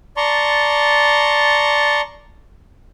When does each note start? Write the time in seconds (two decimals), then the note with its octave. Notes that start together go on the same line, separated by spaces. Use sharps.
0.17 D5 A5 A#5 C6 C#6